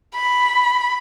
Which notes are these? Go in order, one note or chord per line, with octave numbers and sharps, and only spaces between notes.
B5